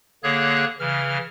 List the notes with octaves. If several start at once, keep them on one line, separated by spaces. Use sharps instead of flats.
D3 A#3 G#4 C#5 F#6
C#3 E3 F6